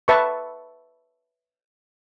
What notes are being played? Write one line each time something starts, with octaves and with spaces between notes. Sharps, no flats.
B4 E5 A5 C#6